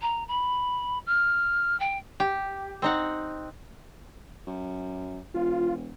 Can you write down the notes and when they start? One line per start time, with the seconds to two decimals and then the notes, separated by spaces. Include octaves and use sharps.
0.02 A#5
0.28 B5
1.06 F6
1.80 G5
2.20 G4
2.82 C4 D#4 F#5
4.47 F#2
5.34 E1 F4